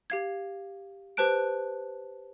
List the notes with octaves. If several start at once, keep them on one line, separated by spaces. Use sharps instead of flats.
G4 F5 G#6
G4 B4 C5 A5 F#6 D7